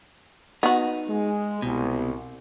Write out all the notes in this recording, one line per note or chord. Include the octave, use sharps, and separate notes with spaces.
B3 D#4 F#4
G#3
C2 B2